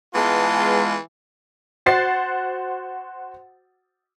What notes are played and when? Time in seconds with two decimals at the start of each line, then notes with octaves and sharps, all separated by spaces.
0.15 E3 G#3 B3 F4 A5
1.86 F#4 C5 F#5 A6 C7